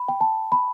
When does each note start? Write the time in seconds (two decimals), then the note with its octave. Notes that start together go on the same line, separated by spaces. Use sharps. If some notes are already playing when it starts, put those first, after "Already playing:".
Already playing: B5
0.08 G5
0.21 A5
0.52 B5